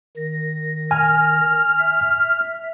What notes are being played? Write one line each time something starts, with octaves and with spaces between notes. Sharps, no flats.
D#3 A#6
G#5 F6
E5